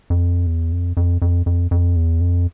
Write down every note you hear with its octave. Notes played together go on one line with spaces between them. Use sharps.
F2
E2
F2
F2
F2
F2
F2
E2
F2